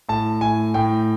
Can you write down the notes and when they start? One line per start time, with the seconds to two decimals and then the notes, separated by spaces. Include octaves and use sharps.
0.09 A2 A5
0.41 A2 G#5
0.74 A2 G5